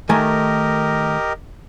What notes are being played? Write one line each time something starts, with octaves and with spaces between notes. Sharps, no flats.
D#3 A3 G4 A#4 D#5 G#5